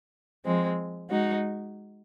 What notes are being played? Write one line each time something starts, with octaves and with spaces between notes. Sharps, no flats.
F3 G#3 C4
G#3 D#4 F#4